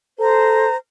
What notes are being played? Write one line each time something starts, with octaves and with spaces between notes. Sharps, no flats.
A4 C5 A#5